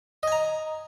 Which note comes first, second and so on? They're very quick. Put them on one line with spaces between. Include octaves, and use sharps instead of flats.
D#5 G#5 A#5